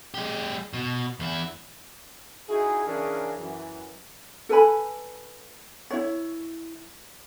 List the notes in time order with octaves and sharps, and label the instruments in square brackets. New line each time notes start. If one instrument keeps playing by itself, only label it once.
[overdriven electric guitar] G#3 G4
B2
E2 E4
[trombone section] D#4 E4 F#4 G#4
C#3 E3 C#4 D4 G#4 A#4
F#2 E3
[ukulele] A4 B4 G#5 B5
E4 C#5